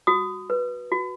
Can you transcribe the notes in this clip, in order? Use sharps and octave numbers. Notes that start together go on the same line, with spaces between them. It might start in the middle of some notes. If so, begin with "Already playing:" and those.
F#4 D#6
B4
F#4